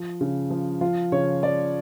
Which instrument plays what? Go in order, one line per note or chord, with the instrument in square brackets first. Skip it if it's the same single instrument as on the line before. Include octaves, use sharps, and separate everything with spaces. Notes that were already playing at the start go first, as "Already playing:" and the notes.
Already playing: [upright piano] F3
C#3
F3
F3 F4
C#3 C#5
F3 D5